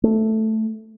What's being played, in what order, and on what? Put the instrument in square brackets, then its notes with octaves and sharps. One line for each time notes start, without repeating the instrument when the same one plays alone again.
[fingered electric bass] A3